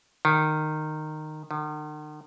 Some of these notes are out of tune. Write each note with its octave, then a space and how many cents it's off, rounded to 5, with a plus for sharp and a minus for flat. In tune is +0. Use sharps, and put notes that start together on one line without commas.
D#3 -15
D#3 -45